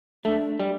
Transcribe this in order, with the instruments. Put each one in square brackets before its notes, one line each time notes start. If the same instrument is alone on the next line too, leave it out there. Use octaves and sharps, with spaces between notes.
[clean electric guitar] A3 [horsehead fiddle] D4
[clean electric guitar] G3